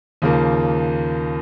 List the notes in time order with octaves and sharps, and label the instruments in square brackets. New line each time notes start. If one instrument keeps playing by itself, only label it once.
[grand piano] D#2 C#3 F3 A#3